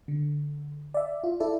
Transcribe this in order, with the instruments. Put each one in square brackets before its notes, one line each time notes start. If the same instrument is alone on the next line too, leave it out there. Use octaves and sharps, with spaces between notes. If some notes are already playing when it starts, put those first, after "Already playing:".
[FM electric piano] D3
D5 E5
F4
E4 A4 D5